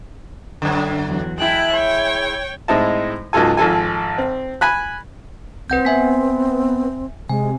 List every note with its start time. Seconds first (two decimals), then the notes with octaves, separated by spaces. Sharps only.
0.62 F#2 D3
1.06 E2 F#3
1.38 G#3 E4 G5 A5 F#6
1.72 C#5 G5
2.68 A2 G#3 C4 D#4 E4 A5
3.33 C#2 G#2 F#3 F4 A4 G#5
3.57 G#1 F3 A4 G#5
4.18 C4
4.61 G#5 B5 F#6
5.70 C2 C4 B4 F#5 G6
5.85 B3 E5 G#5 B6
7.29 C3 G#3 G#5